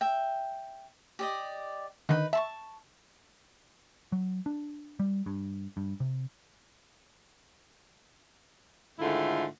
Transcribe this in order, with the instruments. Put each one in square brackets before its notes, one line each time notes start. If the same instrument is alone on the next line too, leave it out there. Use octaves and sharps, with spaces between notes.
[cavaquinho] E5 G5
G4 D5 D#5
[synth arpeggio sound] D3 D#3 [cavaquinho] D#4 B4
[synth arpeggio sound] E5 [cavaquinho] A5 C6 C#6
[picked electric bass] F#3
D4
G3
G2
G2
C3
[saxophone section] G#2 D3 D#3 A3 E4 F4